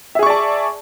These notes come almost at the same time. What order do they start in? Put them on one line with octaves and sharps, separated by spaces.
E5 G#4 C#6 D5 A5